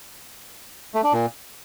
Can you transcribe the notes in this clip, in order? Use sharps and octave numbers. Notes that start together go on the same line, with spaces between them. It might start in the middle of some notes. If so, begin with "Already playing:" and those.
A3
D4
A#2